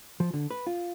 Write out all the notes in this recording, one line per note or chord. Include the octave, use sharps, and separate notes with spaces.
F3
D3
B4
F4